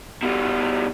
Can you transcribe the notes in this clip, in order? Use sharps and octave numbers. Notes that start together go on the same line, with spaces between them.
B2 G3